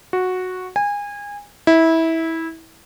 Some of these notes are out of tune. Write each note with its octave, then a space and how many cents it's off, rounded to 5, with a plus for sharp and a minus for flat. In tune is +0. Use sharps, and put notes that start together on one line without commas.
F#4 -10
G#5 -25
E4 -20